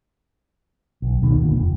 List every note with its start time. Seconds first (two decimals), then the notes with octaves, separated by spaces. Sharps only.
1.02 B1
1.22 D#1 B2 D#3
1.42 E1 D2 A#2
1.56 F1